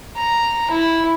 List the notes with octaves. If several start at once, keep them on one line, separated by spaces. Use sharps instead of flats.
A#5
E4